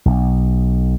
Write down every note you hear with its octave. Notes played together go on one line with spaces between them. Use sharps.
B1